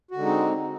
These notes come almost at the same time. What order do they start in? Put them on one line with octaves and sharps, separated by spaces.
F#4 D3 G#3 D#4 C4